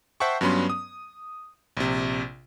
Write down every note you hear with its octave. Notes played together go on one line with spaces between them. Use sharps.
C5 E5 F#5 G5 A5 C#6
G2 F#3 B3 C#4 B5 C6
D#6
A#1 C3